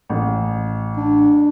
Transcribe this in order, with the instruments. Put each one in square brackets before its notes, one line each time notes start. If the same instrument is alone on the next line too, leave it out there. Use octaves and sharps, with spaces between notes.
[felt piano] A1
[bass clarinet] D4